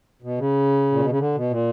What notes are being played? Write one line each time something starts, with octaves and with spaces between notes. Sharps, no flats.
B2
C#3
A#2
B2
C#3
D3
B2
A#2